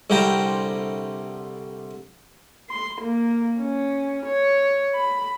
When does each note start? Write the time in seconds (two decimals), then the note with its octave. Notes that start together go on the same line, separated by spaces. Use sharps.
0.10 C2 D3 A#4 C5 G5 A#5
2.70 C6
3.02 A#3
3.59 C#4
4.26 C#5
4.95 B5